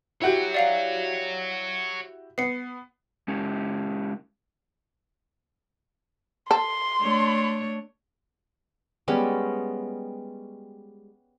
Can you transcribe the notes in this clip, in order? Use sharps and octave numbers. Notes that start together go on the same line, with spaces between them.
E4 F#4 G4 C#5 F#5
D5 F5 F7
B3 C7 C#7
G#3 C#4 G4
A4 C6
A3 D4 C#5
G3 G#3 B3 C#4